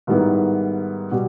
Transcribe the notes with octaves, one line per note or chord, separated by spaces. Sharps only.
G#2 D#3 G3 B3 E4
B2 G3